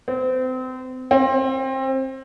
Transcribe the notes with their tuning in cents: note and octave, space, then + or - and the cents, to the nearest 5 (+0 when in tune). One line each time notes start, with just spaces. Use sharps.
C4 -30
C4 +25